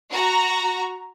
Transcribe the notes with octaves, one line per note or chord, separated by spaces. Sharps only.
F#4 A#5